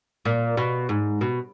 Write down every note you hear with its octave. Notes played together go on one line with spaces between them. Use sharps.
A#2
B2
G#2
B2